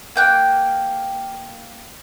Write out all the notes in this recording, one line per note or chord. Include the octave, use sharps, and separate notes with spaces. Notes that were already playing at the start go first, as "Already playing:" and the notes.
A#3 G5 F#6